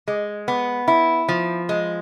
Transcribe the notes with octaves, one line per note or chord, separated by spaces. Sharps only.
G#3
B3
E4
F3
G#3